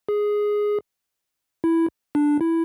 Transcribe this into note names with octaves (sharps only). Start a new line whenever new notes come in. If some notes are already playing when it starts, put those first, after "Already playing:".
G#4
E4
D4
E4